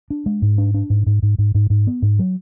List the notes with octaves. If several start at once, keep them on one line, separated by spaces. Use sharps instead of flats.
D4
G#3
G#2
D4
D4
G#2
G#2
G#2
G#2
G#2
G#2
B3
G#2
F#3